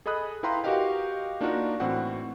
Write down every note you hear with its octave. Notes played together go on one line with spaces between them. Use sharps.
G#4 A4 D#5 B5 D#6 F#6
E4 B4 F5 G5 A#5 C6
F#4 G4 A#4 D#5 F5 G5
A#3 D4 D#4 F4 F#4 A#4
A2 E3 C4 F#4 F#5